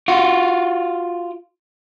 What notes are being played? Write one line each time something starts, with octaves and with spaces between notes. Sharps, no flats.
F4 F#4